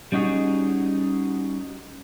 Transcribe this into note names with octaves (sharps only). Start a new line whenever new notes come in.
G3 C#4 D#4 F#4 G#4